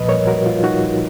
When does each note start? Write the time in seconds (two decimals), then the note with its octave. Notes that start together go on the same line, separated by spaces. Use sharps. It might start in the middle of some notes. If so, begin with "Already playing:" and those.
Already playing: A#2 F3 B4 D#5
0.08 A#4 C#5
0.27 F#4 A#4
0.46 F4
0.63 D#4 F#4